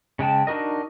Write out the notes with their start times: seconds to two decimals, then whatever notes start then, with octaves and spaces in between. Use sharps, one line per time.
0.19 C#3 G#3 G5 A5
0.47 D4 D#4 F#4 A#4 D#5